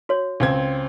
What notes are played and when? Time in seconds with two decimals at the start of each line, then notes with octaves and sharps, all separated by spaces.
0.09 F#4 C#5
0.40 C#2 C4 G#6